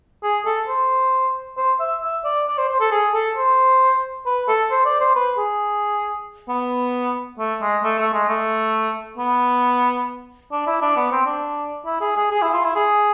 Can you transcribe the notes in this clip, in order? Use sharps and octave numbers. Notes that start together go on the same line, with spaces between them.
G#4
A4
C5
C5
E5
E5
D5
D5
C5
C5
A4
G#4
A4
C5
B4
A4
C5
D5
C5
B4
G#4
B3
A3
G#3
A3
A3
G#3
A3
B3
D4
E4
D4
B3
C4
D4
E4
G#4
G#4
G#4
E4
F4
E4
G#4